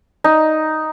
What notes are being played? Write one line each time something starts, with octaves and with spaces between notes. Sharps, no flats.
D#4